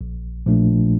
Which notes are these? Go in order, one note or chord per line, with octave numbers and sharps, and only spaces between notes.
A#1
A#2 F3 A3 D4